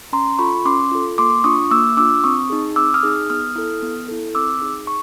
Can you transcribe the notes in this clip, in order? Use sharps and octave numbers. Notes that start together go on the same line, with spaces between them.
C#4 A#5 C6
F4 A4 B5 C#6
C#4 C6 D6
F4 A4
A#3 C6 D6
D4 F4 C#6 D#6
A#3 D6 E6
D4 F4 D6 E6
C4 C#6 D#6
D#4 G#4
C4 D6 E6
D#6 F6
D#4 G#4
B3 D#6 F6
E4 A4
B3
E4 A4
C4 D6 E6
D#4 G#4
C#6